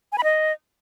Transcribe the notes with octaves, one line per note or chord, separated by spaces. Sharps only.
G#5
B5
D#5